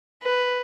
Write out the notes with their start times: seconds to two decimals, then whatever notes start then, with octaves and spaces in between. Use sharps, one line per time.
0.22 B4